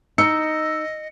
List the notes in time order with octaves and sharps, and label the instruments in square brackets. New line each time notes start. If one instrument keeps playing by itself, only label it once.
[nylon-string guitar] D#4 [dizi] D#5 [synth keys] E6 [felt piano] C#7